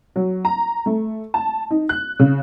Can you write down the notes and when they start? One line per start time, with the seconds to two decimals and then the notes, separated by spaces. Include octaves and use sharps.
0.16 F#3
0.45 A#5
0.86 A3
1.34 A5
1.71 D#4
1.89 F#6
2.19 C#3